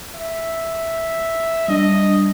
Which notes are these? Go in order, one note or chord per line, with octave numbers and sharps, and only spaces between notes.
E5
G3 D4 D#5